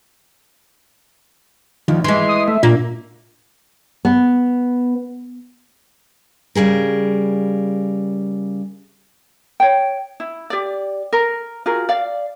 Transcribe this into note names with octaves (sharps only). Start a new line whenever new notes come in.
D2 D#3 F3
E3 G#3 C6
D#6
A3 E5
A#2 A#3 D4
B3
C#3 G3 G#4 A#4
C#5 G5
E4
G4 D5
A#4
F4 F#4 G#4 A#4
D5 F5